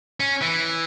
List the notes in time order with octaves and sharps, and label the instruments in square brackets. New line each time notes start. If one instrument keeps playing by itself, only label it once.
[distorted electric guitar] C#4
E3